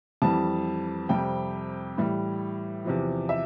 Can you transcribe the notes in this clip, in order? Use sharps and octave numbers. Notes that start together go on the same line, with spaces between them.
F2 E3 G3 A5
F2 C3 G3 G5
A2 E3 G3
E2 C3 F3
E5